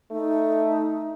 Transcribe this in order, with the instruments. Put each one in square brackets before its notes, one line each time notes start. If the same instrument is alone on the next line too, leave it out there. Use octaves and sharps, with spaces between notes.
[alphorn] A3 [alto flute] D#4